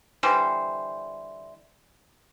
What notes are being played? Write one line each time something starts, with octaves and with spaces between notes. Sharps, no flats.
D3 E3 G3 C5